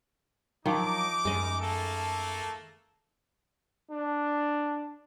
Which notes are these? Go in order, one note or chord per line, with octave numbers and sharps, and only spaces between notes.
D#3 F3 F#3 D#4 D6
F#2 G#3 D#5
A3 A#3 A4
D4